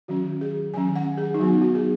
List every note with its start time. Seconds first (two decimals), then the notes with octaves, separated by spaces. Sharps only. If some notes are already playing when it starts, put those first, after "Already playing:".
0.08 D#3 F#3 C#4 F#4
0.41 G#4
0.74 D#3 F#3 C#4 G#5
0.96 F#5
1.18 G#4
1.34 D#4
1.40 F#3 B3 F#4
1.62 F#4
1.75 G#4